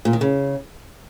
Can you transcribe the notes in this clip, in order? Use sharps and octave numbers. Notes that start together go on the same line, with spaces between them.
A#2
D#3
C#3